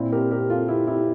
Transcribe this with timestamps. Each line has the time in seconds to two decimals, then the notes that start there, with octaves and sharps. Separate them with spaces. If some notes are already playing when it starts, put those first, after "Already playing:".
Already playing: A#2 C4 E4
0.12 G4 A#4
0.31 G4 A#4
0.50 F4 A4
0.68 E4 G4
0.87 E4 G4